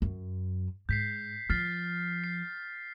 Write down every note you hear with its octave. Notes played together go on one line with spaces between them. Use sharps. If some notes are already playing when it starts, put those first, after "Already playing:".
F#2
G#2 G6 B6 C7
F3 F6 A6 C7
C7